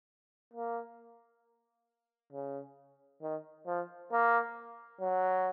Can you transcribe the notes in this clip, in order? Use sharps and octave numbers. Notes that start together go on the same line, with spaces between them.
A#3
C#3
D#3
F3
A#3
F#3